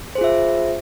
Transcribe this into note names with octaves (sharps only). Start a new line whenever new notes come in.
F4 G#4 C5 E5